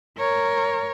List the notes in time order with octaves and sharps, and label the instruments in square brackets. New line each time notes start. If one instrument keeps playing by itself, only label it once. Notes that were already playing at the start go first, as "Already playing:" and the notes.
[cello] A#4 C#5